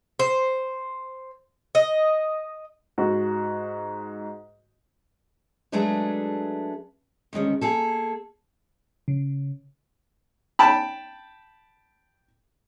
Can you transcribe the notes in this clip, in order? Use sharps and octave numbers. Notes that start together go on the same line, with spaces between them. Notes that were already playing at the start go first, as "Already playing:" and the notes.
C5
D#5
G#2 F#4
F#3 G#3 A3 D4 G#4 B4
D2 D#3 G#3 C#4
A#3 G#4 A4
C#3
G5 A5 B5